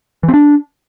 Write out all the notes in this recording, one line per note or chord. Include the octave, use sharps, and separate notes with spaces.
E3
C4
D4